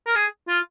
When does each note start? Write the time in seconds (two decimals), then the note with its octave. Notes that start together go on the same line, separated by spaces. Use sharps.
0.07 A#4
0.16 G#4
0.48 F4